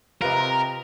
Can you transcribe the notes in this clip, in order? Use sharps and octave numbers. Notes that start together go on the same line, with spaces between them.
C3 F4 A#4 B4 D#5 A#5